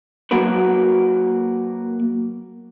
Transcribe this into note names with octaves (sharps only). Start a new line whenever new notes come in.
F#3 A#3 F#4 A#4 B4